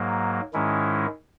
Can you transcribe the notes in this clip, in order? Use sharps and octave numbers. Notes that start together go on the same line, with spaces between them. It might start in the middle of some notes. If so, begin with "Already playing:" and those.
Already playing: G#2 F#3 A#3
G#2 D#3 G#3 C#4 E4